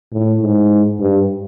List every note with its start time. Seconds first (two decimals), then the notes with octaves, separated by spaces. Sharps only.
0.12 A2
0.41 G#2
1.00 G2